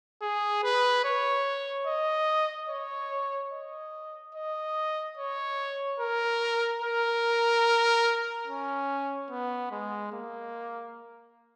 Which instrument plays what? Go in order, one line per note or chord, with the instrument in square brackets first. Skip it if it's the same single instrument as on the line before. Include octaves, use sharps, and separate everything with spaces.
[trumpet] G#4
B4
C#5
D#5
C#5
D#5
D#5
C#5
A#4
A#4
C#4
B3
G#3
A#3